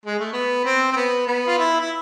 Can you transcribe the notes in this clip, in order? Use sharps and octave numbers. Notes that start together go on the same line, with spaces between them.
G#3
A3
B3
C4
C4
B3
B3
F4
E4
E4